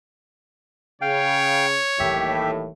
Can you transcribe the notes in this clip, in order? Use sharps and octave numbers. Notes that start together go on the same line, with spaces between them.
C#3 C#5 F5 G5
D#1 D#2 A2 E3 G4 E5